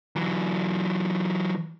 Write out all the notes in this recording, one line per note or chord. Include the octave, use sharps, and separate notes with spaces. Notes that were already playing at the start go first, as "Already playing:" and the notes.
E3 F#3